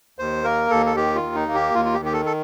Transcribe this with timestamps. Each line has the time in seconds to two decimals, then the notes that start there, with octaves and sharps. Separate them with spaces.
0.19 D#2 C5
0.44 A#3 A#4
0.70 D#2 A4
0.86 A4
0.96 D#3 G4
1.15 F4
1.23 D#2
1.35 D#4
1.48 A#3
1.54 G4
1.74 D#2 F4
1.85 F4
1.94 G4
2.00 D#3
2.05 G4
2.13 A4
2.26 A4